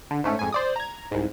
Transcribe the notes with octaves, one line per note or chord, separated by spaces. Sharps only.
D3
G#2 A3 C#4
F2 G#2 G#5
C5 D5 D#6
A#5 G#6
C2 G#2